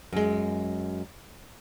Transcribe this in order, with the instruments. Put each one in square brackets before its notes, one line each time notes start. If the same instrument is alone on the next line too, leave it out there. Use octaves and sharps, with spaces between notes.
[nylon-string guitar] F#2 G#3